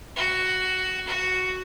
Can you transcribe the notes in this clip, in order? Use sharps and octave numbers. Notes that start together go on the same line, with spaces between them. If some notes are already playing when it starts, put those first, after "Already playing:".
F#4
F#4